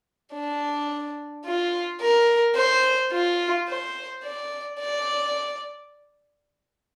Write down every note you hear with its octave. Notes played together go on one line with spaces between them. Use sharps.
D4
F4
A#4
C5
F4
C5
D5
D5